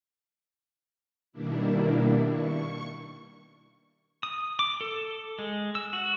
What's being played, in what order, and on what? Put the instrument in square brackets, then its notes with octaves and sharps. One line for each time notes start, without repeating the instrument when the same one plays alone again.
[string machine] B2 D#3 G3 A#3 D4 E4
C#6
[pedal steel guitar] D#6
D6
A4
G#3
E6
F#4